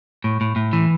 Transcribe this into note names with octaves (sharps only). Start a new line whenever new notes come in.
A2
A2
A2
E3